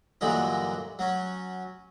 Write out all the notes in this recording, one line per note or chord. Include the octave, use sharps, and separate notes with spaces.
G2 A#2 D3 E3 F#3 D#4
F#3 C#4